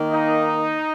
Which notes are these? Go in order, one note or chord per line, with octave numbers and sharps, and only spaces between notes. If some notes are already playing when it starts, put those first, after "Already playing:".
Already playing: D#3 A#3
D#4